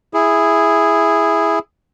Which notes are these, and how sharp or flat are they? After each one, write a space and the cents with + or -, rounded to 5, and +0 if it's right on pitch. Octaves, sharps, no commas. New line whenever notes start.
E4 +0 G#4 -5